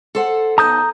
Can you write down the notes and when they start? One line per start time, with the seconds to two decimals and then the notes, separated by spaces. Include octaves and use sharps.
0.15 A4 C5 F#5
0.58 D#2 B3 A5 A#5 D#6 G6